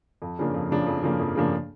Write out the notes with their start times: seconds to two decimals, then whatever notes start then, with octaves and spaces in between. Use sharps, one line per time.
0.22 F2
0.39 C#3 F3 A#3 D4
0.54 F2
0.71 C#3 F3 A#3 D4
0.87 F2
1.03 C#3 F3 A#3 D4
1.19 F2
1.36 C#3 F3 A#3 D4